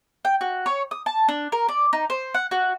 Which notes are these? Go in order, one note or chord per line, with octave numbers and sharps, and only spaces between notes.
G5
F#4
C#5
D#6
A5
D4
A#4
D5
D#4
C5
F#5
F#4